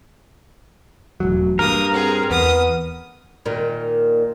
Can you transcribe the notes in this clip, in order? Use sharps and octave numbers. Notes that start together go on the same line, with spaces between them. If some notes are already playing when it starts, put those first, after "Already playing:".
E1 A1 F#3
G2 A#3 A#4 D#6
C4 G#4
E2 B3 D#6
A#2 D#3